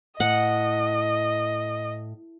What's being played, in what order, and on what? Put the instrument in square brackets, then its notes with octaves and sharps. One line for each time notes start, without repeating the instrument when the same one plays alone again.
[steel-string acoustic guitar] A2 [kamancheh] D#5 [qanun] F#5